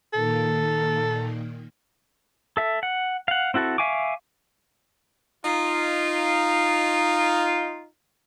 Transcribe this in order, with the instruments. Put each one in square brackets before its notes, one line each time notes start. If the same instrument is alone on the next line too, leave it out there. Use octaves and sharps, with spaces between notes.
[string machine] A#2 D#3 A#3 [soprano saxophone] A4
[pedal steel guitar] A4 E5
F#5
F5 F#5
C4 E4 F#4 A4
E5 F5 G#5 C#6 D6
[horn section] D#4 F4